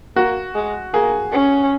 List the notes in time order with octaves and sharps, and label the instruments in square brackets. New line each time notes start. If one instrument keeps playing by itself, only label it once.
[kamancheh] A#3 [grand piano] F#4
[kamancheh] G#3
[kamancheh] A#3 [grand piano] G#4
[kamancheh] C#4